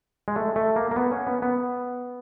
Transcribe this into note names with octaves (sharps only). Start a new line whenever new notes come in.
G#3
A3
A3
A#3
A#3
B3
C#4
B3
B3